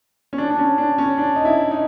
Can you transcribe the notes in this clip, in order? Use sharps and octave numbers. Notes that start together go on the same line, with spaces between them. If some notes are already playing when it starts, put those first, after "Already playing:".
C#4
D4
D4
C#4
D4
C#4
D4
D#4
E4
D#4